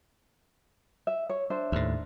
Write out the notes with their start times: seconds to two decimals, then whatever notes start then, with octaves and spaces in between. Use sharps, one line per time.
1.07 E5
1.30 C#5
1.50 D4 C5 E5
1.72 D#2 A2